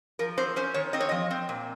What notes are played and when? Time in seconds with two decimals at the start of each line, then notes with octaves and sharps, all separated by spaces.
0.19 F3 A#4
0.37 C4 C5
0.56 C#4 C5
0.74 D#3 C#5
0.93 C4 D#5
1.00 C#5
1.09 F3 D#5
1.31 C4
1.49 A#2